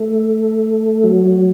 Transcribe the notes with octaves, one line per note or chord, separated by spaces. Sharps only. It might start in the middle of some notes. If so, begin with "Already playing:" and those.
Already playing: A3
F#3